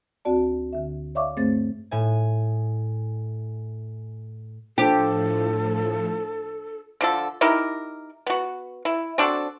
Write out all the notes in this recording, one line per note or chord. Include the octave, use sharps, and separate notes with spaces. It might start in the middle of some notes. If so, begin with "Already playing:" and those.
D2 C4 F#4 D5 A5
D2 D3 E5
C#5 D5 E5 F5 C#6 D6
G2 A3 C4 G#4 C5 A6
A2 G#5
A2 F3 D4 F4 G4 A4 C5
D3 F3 A4
D#4 E4 G4 A#4
B3 F#4
E4
C4 D4 F#4 A4